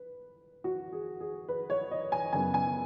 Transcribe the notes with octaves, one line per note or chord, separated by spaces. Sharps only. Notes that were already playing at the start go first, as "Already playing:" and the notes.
Already playing: B4
F#4
G#4
G#4
B4
C#5
D#5
G#5
F#2 C#3 B3 G#5
G#5